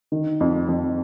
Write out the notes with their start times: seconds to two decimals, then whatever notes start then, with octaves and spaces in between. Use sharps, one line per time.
0.12 D#3
0.41 F2
0.68 F2